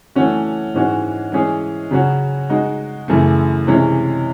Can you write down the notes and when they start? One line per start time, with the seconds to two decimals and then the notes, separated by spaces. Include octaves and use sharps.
0.15 E3 A3 C#4 F#4
0.74 G#2 E3 G#3 C#4 F#4
1.32 E3 G#3 C#4 G#4
1.91 C#3 F#3 C#4 F#4
2.49 G#3 D#4 F#4
3.08 F#2 C#3 E3 A3
3.67 C3 E3 G#3 C#4